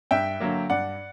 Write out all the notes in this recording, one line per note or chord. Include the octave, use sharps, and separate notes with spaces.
G2 E5 G5
D3 F#3 A#3
G2 D5 F#5